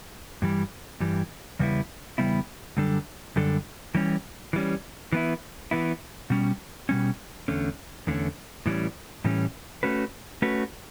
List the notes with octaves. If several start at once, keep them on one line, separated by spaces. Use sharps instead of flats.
G2 E3 G3
G2 E3 G3
E2 C#3 G3 B3 E4
E2 C#3 G3 B3 E4
F#2 D3 G3 D4 A4
F#2 D3 G3 D4 A4
E3 G3 C#4
E3 G3 C#4
E3 B3 E4
E3 B3 E4
B2 G3 C#4
B2 G3 C#4
E2 D3 A3 C#4
E2 D3 A3 C#4
A2 E3 G3 C#4
A2 E3 G3 C#4
A3 C#4 F#4 B4
A3 C#4 F#4 B4